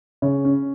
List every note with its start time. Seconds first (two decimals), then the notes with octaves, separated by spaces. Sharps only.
0.22 C#3 C#5
0.45 C#4